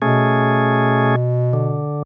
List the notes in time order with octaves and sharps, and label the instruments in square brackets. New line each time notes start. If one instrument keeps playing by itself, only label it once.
[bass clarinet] B2 [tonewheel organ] A3 C#4 G#4
[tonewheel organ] D3